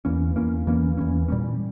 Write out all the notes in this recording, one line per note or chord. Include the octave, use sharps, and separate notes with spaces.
E2 E3 A#3 C#4
E2 E3 A#3 C#4
E2 E3 A#3 C#4
E2 E3 A#3 C#4
A#2 G3 A#3 C#4